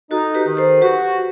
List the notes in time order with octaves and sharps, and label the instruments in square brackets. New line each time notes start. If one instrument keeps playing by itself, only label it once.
[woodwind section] D#4 [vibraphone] F#4 A4
[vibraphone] G4 B4
[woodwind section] D#3
[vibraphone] A4 C5
[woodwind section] F#4 [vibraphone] G4 B4